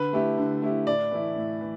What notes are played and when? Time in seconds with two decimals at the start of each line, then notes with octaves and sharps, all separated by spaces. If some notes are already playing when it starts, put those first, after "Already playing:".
Already playing: D3 B4
0.13 A3 E4 G4
0.37 D3
0.62 A3 E4 G4
0.87 A2 D5
1.11 E3 A3 E4
1.36 A2
1.61 E3